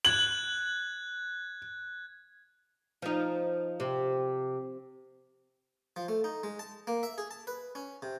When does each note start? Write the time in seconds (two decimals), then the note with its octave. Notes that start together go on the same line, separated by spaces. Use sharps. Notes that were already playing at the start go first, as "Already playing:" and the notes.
0.05 F#6 G#6 F#7
3.02 F3 D#4
3.80 C3
5.96 F3
6.08 A3
6.24 D#4
6.43 G#3
6.59 A5
6.87 A#3
7.03 E5
7.18 G#4
7.31 A5
7.47 B4
7.75 C#4
8.02 C3